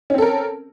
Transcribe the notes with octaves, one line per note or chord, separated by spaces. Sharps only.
C4 C#4 A4 A#4